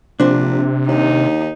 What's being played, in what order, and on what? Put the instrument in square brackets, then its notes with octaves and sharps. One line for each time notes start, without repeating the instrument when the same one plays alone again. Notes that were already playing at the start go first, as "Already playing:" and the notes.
[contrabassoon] A#1 [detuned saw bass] C3 [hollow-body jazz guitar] D4 C5
[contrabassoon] D#2 [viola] D#4